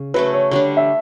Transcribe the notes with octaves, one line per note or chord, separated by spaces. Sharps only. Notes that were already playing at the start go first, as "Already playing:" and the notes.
Already playing: C#3
F#3 A3 C#4 B4
C#5
D3 G3 D4 C#5
E5